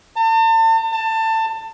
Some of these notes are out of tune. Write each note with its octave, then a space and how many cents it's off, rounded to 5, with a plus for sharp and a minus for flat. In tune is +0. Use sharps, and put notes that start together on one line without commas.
A5 +40
A5 +20